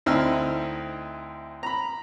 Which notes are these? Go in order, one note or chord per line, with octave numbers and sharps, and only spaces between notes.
D2 C4 D#4 E4 E6 F6
A#5 B5